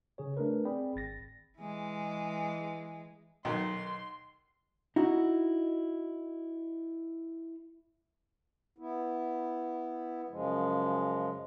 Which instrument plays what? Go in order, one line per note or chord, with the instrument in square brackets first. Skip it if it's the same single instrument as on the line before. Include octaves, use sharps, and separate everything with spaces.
[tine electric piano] C#3 G#4 C#5
A3 D4 A#4 B4
C4 G#4 D5 G5 B5
G#1 A6 A#6
[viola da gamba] E3 G#3
[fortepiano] B1 B2 D#3 [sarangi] C6
[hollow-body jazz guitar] D#4 E4 F#4
[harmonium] B3 E4
F#2 C#3 F3 G#3